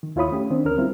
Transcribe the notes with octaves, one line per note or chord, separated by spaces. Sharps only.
D#3
D#2 E4 F4 C#5 B5 D#6
A3 C#4 G4
D#3 C4 D4
D2 C#4 A#4 F6
G3 C4 E4 F4